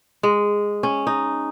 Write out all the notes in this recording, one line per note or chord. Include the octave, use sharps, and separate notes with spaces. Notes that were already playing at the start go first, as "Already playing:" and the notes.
G#3
C#4
D#4